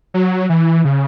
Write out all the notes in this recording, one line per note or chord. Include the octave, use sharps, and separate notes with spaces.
F#3
E3
C#3